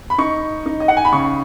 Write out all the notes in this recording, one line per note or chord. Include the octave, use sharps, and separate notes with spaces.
B5
D#4 C#6
D#4
D#5
F#5
G#5
B5
C#3 C#6